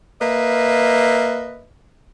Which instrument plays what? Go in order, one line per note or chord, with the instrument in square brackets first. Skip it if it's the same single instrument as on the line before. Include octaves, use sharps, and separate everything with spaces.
[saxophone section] A#3 B4 D#5 E5